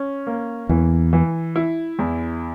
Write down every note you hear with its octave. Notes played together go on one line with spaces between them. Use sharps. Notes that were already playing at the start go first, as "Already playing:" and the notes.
Already playing: C#4
A#3
E2 E3
E3
E4
E2